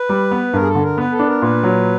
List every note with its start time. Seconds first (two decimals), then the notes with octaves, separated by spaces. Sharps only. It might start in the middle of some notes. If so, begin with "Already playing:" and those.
Already playing: B4
0.09 G3
0.31 B3
0.53 G2 A#4
0.62 G#4
0.68 A4
0.75 D3
0.83 A#4
0.98 B3 B4
1.12 A4
1.19 D4
1.27 A#4
1.41 A#2 B4
1.63 F#3